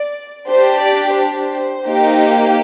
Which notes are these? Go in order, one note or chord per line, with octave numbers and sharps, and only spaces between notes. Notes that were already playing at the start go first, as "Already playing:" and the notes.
Already playing: D5
D4 G4 C5
D5
C5
A#3 D#4 G4